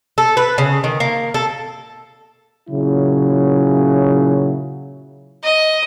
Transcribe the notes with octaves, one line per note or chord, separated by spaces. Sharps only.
A4
B4
C#3
D#3
A#3
A4
A#2 C#3 F#3 E4
D#5